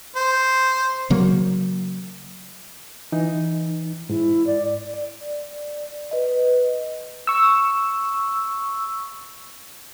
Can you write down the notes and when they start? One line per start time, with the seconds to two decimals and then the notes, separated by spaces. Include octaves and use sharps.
0.16 C5
1.10 C#3 F#3 A#3
3.12 E3 D#4
4.10 G#2 E4
4.47 D5
4.94 D5
6.11 B4 D#5
7.27 C#6 E6